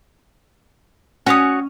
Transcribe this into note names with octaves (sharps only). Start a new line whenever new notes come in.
C#4 F#4 C#5 D#6